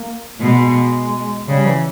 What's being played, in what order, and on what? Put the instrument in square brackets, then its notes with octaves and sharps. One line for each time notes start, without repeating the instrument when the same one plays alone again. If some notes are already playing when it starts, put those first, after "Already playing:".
Already playing: [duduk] A#3
[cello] B2 [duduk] G#3
[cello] C#3 [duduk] G3
[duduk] E3